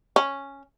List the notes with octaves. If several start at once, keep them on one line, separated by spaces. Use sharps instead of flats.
C#4